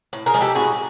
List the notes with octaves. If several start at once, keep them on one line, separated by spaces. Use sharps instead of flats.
A2
G#4 A#4
F3 G#3
G4 A4
A2 F#4 G#4